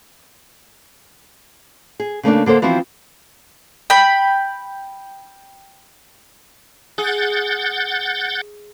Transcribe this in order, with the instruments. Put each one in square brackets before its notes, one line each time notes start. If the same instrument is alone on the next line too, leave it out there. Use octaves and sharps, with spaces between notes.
[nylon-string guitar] G#4
C#3 A3 A#3 D4
D3 A#3 A4 C5
E3 F3 B3 C4 E4 F#4
[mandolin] G5 B5
[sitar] G#4 [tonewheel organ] F#5 G6 A6